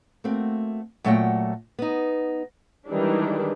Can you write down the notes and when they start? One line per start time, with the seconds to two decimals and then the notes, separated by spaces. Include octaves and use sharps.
0.24 A3 A#3 C4 F#4
1.04 A#2 F#3 A3 F4 F#5 G5
1.79 B3 D#4
2.87 D#3 E3 G3 G#3 D4